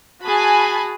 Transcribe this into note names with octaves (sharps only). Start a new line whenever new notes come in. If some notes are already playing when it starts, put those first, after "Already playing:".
F#4 G#4 G#5 A5 B5